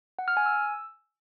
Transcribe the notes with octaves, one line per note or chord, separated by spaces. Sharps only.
F#5
F6
G#5
E6